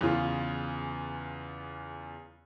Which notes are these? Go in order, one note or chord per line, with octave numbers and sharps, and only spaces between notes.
E2 C#3 F4